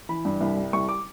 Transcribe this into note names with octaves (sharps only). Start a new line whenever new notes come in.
E3 B5
G2
C2
G3
C2 C#6
D6